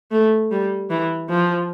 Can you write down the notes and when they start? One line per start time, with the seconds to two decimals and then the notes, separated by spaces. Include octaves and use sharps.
0.11 A3
0.52 G3
0.90 E3
1.30 F3